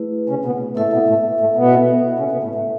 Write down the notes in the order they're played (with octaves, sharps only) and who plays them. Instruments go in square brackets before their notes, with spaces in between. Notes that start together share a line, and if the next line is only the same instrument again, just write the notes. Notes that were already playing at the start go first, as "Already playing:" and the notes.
Already playing: [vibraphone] A3 E4 G#4 B4
[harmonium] C#3 C#4
B2 B3
[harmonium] A2 A3 [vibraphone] E4 A4 E5
[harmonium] B2 B3
A2 A3
A2 A3
B2 B3
C#3 C#4
B2 B3
A2 A3
A2 A3